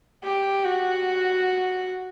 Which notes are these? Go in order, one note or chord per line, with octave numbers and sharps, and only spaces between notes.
G4
F#4